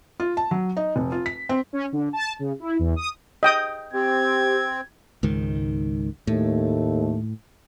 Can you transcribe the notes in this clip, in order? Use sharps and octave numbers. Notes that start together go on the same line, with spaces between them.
F4
A5
F#3
D#4
F1
F4
B6
C4
C#4
D3
A5
C#3
E4
E2
D#6
D#5 G5 D#6
C4 G4 G#6
C#2 G#2 D#3
D#2 A2 A3